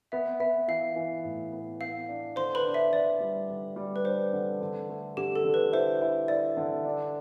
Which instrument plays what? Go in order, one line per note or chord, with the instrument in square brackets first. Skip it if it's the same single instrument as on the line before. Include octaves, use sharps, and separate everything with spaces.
[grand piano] B3 [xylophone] E5
[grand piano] B3 [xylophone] E5
[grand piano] E3 [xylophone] F5
[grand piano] E3
A2
B3
[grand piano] B3 [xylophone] F5
[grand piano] D4
[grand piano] D3 [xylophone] C5 C6
[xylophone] B4 B5
[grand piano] D4
[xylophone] E5
[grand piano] D3 [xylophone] D5
[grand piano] G3
D3
G3
[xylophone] B4
[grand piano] D4 [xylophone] C5
[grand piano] D3
D3
A3
[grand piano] D3 [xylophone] G4
[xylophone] A4
[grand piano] D3
[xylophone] B4
[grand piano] E4 [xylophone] C5
[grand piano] E4
[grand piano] E4 [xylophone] D5
[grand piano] D3
D4